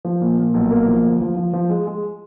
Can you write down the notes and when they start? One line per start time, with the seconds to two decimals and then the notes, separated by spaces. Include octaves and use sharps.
0.05 F3
0.21 A#2
0.38 A#2
0.54 B1
0.71 A#3
0.88 F3
1.04 D2
1.21 F3
1.37 F3
1.53 F3
1.69 G#3
1.87 G#3